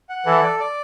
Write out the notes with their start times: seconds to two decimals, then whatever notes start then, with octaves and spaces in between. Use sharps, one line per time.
0.09 F#5
0.26 E3 A4
0.43 D5
0.59 D5